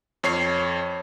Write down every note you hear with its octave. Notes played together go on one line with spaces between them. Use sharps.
F2 C#5 C7